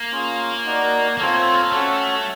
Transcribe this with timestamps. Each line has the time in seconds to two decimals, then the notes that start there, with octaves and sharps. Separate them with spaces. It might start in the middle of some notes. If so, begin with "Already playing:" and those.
Already playing: A#3
0.11 C#4 F4 G#4
0.65 D#4 F#4 A#4 D5
1.18 A#3 C4 F4 A4 C#5
1.37 A3
1.54 A#3
1.72 A3 C#4 F#4 A4 C#5